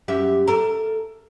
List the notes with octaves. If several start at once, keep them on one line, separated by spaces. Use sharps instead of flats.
F#2 G4 E5
A4 A#4